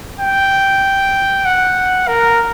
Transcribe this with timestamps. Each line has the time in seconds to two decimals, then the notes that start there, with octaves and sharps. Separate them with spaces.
0.20 G5
1.45 F#5
2.08 A#4